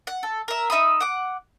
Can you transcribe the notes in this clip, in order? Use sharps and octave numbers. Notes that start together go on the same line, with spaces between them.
F#5
A4
A#4 E5
D#4 E5 B5 D#6
F#5 D6